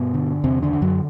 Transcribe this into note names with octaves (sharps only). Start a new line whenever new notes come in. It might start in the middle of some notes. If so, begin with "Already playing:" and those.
Already playing: G2 B2 B3
D3
E2 C3 C4
D3 D4
D3
F#2 F#3